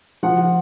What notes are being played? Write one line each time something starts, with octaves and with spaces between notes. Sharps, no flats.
F3 F#5